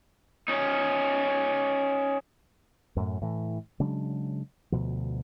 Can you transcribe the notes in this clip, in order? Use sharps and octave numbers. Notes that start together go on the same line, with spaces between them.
C#4 D#4
F#2 A2
A2 E3
C#3 F#3 G#3 D4
D2 B2 F3